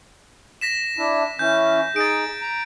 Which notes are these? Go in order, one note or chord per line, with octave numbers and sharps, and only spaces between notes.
A#6 B6 E7
D4 E4
E3 C#4 G6
D#4 G#4 A6 D7
A#5